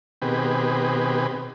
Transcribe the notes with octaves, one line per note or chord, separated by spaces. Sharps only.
B2 D#3 C4 G4 G#4 B4